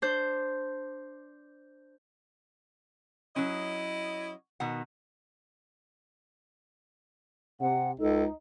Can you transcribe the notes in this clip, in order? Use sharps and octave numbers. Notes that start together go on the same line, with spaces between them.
D4 C5 G6
F#3 C#4 E4 D#5
B2 D#3 F#5
C3 F#5
C#2 D#4 A4